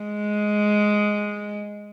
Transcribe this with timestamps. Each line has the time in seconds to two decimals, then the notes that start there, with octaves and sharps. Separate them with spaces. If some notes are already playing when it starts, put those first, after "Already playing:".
Already playing: G#3